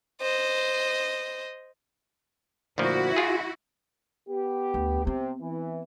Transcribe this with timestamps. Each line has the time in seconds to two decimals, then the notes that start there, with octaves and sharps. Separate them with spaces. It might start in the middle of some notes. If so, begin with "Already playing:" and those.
0.21 C5 D#5
2.78 D2 A#2 F3 E4 F#4
3.16 F4 G#4
4.29 B3 G4
4.74 D2
5.05 C3 B3 C4
5.41 E3